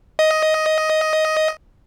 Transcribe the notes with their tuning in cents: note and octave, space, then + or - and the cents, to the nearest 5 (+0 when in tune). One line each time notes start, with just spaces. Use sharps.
D#5 +10